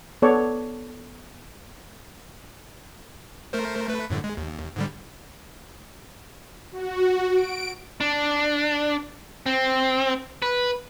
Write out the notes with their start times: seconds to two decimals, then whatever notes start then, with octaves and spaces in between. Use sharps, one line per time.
0.22 B3 A4 C#5 D5
3.53 A3 A#4 C5
3.88 A3 B4
4.10 F#2 A2 D3
4.24 G#3
4.37 D#2
4.76 G#2 D3 G3
6.72 F#4
7.34 D7
8.01 D4
9.46 C4
10.42 B4